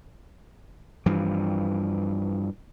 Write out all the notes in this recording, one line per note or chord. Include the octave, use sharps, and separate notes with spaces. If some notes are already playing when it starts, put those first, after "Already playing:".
G2 E3 F3